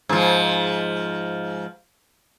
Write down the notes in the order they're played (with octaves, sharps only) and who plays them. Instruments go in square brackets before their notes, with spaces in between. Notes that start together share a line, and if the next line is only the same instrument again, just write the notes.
[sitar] G#2 F3